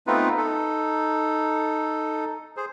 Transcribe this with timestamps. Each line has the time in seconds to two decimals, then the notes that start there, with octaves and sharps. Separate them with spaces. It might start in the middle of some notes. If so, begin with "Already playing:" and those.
0.07 A3 B3 C4 D#4 F4 B4
0.37 D#4 A4
2.57 G#4 C5